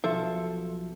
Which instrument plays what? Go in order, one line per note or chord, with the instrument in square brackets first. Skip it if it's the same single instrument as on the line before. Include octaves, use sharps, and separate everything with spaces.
[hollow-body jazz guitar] B1 F3 A4 E5